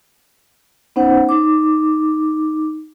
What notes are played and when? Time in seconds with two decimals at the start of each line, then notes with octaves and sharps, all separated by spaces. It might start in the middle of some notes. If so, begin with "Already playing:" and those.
0.96 B3 C#4 D#4 C5 F#5
1.29 D#4 D6